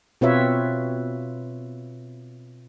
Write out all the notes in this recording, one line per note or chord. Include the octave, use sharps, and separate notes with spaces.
B2 C4 F4 B4 C#5 E5